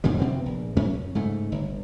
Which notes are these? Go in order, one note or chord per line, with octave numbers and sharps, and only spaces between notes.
F2 A#2 C#3 G3
C3 B3 C4
A#1
F#2 C#4
G#2 C#3 A3
G1